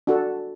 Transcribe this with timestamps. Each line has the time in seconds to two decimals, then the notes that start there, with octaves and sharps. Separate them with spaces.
0.07 D4 F#4 A4